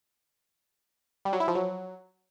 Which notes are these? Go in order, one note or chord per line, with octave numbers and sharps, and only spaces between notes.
G3
F#3
E4
F3
F#3